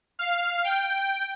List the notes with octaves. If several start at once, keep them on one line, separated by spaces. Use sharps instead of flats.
F5
G5